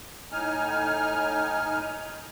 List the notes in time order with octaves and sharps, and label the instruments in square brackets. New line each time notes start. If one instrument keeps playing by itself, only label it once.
[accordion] A2 D#4 G#5 F6